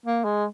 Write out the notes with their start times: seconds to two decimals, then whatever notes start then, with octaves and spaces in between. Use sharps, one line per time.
0.06 A#3
0.25 G#3